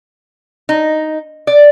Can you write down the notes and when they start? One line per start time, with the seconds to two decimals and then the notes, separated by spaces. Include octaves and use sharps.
0.69 D#4
1.47 D5